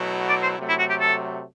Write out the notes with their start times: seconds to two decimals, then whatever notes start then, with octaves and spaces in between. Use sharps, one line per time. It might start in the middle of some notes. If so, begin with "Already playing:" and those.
Already playing: B2 F#3 A3 E4
0.29 D5
0.43 C5
0.57 C3 F#3 A3
0.69 E4
0.79 F#4
0.89 G4
1.00 A4